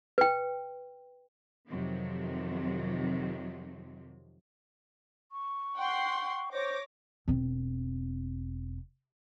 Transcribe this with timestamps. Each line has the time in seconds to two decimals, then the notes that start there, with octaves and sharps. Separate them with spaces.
0.18 B4 G5
1.68 F2 C3 D#3 F3 F#3
5.32 C#6
5.78 F#5 G5 C6
6.52 C5 C#5 D6 A#6
7.28 E1 C4